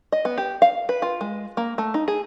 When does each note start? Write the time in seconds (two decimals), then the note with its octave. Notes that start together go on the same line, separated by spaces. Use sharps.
0.12 D#5
0.25 B3
0.38 G4
0.62 F5
0.89 B4
1.02 F4
1.21 G#3
1.57 A#3
1.78 A3
1.94 D#4
2.08 G#4